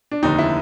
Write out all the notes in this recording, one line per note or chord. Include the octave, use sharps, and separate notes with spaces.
D4
F1 D#2 D3 D#4
E4